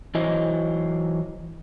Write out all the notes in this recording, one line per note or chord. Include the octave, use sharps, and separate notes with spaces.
E3 F#3 E4 C5 D#5